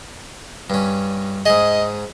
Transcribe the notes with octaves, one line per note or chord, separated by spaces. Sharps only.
G2 C#4
G#2 G#4 D#5